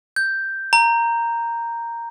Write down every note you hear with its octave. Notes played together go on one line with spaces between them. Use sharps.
G6
A#5